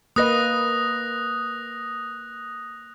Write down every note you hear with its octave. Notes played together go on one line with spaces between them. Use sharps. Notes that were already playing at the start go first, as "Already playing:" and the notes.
A#3 B4 D#5 D#6 F#6 A#6